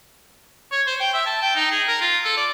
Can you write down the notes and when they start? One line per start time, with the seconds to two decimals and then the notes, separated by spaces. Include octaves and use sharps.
0.72 C#5
0.87 C5
1.00 G5
1.13 E5
1.26 A5
1.41 G5
1.55 D#4
1.71 G#4
1.88 A#4
2.01 F4
2.24 A4
2.37 D5